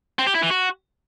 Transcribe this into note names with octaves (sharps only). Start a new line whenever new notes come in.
C4
G4
E4
E3
F#4